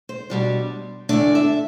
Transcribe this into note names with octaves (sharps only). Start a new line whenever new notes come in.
C5
B2 G3 D4
E2 D3 A3 D4 D5
E5